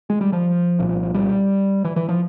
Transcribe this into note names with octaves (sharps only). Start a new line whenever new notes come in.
G#3
G3
F3
C2 A#2
G3
E3
E3
F3